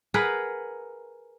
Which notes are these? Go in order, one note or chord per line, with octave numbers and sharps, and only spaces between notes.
G#4 A#4 B4 F#5